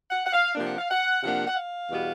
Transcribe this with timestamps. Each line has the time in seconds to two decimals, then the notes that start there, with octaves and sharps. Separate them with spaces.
0.10 F#5
0.26 F#5
0.33 F5
0.55 C3 F3 A#3 D4
0.67 F#5
0.78 F5
0.90 F#5
1.22 C3 F3 A#3 D4 F#5
1.47 F#5
1.56 F5
1.89 E2 B2 G3 B3